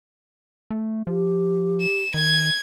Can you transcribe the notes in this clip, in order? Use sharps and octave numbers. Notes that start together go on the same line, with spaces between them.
A3
F3 G4
E7
D#3 G#6